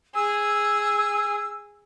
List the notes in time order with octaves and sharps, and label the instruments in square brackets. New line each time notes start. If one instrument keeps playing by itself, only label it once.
[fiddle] G#4 [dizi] E6